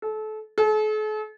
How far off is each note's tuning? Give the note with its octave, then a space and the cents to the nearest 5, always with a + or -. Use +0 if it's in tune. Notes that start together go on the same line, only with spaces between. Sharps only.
A4 -30
A4 -45